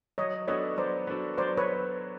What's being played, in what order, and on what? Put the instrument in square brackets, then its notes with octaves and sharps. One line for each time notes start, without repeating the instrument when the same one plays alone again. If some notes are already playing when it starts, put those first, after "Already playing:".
[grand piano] F#3 [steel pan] C#5 D#5
[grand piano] B3 D4 F#4 A4 [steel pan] C#5 D#5
[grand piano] F#3 [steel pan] C5 D5
[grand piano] B3 D4 F#4 A4
[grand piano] F#3 [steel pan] C5 D5
[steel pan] B4 C#5